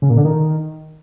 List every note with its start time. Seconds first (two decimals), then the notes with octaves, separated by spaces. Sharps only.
0.02 C#3
0.10 A#2
0.17 D3
0.25 D#3